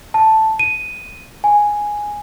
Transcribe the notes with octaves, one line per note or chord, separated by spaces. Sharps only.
A5
D#7
G#5